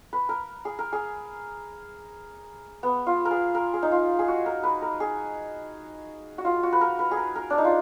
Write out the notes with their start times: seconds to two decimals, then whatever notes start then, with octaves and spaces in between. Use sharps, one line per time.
0.13 B4
0.29 A#4
0.65 G#4
0.79 A#4
0.93 G#4
2.83 B3
3.07 F4
3.25 A#4
3.31 G#4
3.55 A#4
3.73 G#4
3.82 D#4
3.92 F4
4.19 G#4
4.28 F#4
4.46 A#4
4.63 B4
4.82 A#4
5.00 G#4
6.38 F#4
6.45 F4
6.63 F#4
6.73 B4
6.81 A#4
6.99 B4
7.11 G#4
7.17 A#4
7.36 A#4
7.50 D4
7.58 D#4
7.64 F4